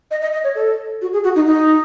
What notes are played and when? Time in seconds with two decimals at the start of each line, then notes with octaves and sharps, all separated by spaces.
0.11 D#5
0.22 D#5
0.33 D#5
0.44 C#5
0.55 A4
1.02 F#4
1.13 G#4
1.24 F#4
1.36 D#4
1.47 D#4